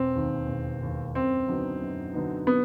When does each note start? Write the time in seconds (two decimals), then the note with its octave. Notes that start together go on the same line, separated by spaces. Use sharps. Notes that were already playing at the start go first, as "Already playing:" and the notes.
Already playing: E1 C4
0.16 D#2 D#3
0.49 E1
0.81 D#2 D#3
1.15 F#2 C4
1.48 D3 F#3 B3 D#4
1.81 F#2
2.14 D3 F#3 B3 D#4
2.47 B3